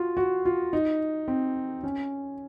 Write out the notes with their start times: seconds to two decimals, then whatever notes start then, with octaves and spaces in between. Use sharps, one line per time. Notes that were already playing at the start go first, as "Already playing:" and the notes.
Already playing: F4 F#4
0.17 F#4
0.45 F4
0.73 D#4
1.28 C4
1.83 C#4